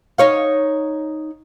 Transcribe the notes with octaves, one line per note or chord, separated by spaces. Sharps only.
D#4 C#5 F5